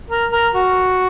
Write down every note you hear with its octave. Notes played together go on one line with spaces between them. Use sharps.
A#4
A#4
F#4